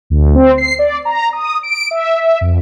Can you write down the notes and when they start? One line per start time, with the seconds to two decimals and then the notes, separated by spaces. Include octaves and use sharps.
0.10 D2
0.35 C4
0.58 C7
0.79 D5
1.05 A#5
1.33 D#6
1.63 D7
1.91 E5
2.20 E5
2.41 F2